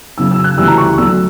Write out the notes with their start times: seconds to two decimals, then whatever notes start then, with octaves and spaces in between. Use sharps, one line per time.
0.18 F#2 C#3 F#3 E6
0.31 E6
0.44 F#6
0.57 D2 C#3 E3 G3 E6
0.68 A#5
0.78 C#6
0.98 D2 D3 F#3 E6